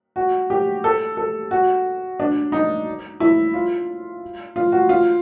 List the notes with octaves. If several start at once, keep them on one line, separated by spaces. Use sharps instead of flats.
F#4
G4
A4
A4
F#4
D4
D#4
E4
F4
F4
F#4
F4